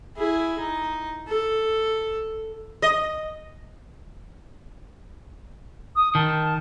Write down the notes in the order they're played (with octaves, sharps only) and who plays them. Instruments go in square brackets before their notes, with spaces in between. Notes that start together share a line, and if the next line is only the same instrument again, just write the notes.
[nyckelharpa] E4 G#4
D#4
A4
[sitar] D#5
[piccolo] D#6
[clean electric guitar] D#3 [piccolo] A5